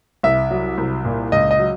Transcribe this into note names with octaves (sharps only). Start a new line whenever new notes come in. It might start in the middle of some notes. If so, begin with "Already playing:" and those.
C2 E5
F#3
C2
A#2
C#2 D#5
D#5
F#3